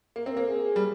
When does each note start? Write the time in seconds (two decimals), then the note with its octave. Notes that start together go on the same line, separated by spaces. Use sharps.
0.16 A#3 A#4
0.26 C4
0.37 A#3
0.48 G#4
0.76 G3